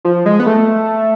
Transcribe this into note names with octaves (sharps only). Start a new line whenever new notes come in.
F3
G#3
B3
A3